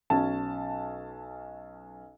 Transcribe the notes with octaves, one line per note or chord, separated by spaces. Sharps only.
B1 C#4 A5